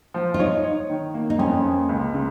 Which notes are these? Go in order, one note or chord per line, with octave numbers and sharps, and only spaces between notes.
F3
F4
D#4 C#5
C#5
D#3
A#3
D#4
F2 C#4
A#3
C#2
C#3